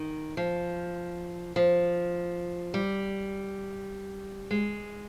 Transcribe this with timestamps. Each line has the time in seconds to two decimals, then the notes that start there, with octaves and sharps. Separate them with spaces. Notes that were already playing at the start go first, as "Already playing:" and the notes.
Already playing: D#3
0.37 F3
1.56 F3
2.74 G3
4.51 G#3